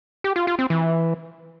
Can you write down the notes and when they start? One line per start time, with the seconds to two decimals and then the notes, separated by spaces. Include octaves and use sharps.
0.24 G4
0.36 F4
0.47 F4
0.59 C4
0.70 E3